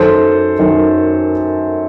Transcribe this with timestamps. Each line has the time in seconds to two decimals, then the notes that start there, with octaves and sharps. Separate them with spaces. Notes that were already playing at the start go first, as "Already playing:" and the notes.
Already playing: F#2 D#3 A4 C5
0.59 F#2 D#3